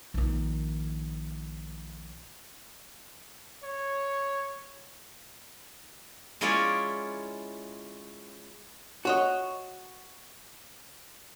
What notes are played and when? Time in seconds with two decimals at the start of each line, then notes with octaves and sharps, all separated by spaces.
0.14 A#1 D#3
3.63 C#5
6.41 G#3 C#4 E4 F4 C#5 D5
9.05 F#4 C#5 D#5